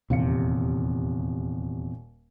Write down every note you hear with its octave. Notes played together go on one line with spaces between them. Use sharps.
D#1 E2 C3 F5 C#7